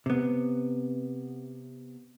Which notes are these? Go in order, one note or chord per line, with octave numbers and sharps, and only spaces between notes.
C3 B3